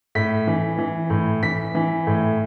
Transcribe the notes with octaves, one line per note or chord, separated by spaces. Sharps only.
A2 B6
E3
E3
A2
E3 B6
E3
A2